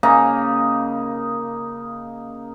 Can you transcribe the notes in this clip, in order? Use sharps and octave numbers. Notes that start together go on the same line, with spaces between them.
C#3 A#3 D#4